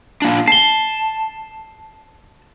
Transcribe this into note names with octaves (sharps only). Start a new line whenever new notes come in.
A#3 D4
A5 C7 G7